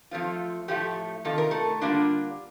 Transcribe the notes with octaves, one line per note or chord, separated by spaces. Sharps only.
F3 A3 C4 F4
A2 F3 A3 G4
C3 D#3 F4 A4
A#4
A3 A4
D3 G3 A#3 D4 F4